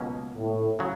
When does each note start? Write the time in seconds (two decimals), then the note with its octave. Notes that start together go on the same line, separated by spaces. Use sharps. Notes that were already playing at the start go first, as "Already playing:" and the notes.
Already playing: C#2 B2 F#3 A#3 C#4
0.36 A2
0.79 C#3 F#3